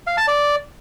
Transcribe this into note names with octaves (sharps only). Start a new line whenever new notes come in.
F5
A5
D5